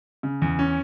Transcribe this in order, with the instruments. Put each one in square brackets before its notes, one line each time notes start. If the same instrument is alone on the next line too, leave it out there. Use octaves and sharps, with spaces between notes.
[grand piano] C#3
E2
C#4